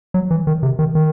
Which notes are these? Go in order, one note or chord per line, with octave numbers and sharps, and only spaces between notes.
F#3
E3
D#3
C3
D#3
D#3